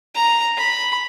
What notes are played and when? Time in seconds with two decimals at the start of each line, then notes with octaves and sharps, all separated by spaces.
0.15 A#5
0.57 B5